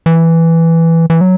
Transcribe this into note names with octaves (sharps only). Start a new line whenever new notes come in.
E3
E3
F#3